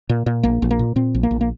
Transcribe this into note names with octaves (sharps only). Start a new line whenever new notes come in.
A#2
A#2
A#1 A#3
A#1
A#3
A#2
A#2 C4
A#1
A#3
A#1
A#3